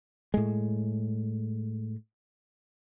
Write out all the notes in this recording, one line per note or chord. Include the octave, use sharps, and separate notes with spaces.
A2 G#3